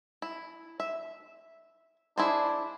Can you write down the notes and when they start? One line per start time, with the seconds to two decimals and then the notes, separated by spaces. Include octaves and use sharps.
0.22 E4
0.80 E5
2.17 D4 E4 G#4 C5